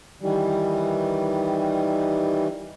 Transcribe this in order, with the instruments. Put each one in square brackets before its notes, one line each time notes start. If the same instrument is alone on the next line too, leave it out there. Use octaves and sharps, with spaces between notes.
[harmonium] D#3 E3 G3